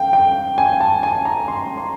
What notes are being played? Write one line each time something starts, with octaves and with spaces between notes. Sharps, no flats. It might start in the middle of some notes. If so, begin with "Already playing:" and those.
Already playing: F2 F5 G5
G5
G#5
A5
G#5
A#5
C6
C6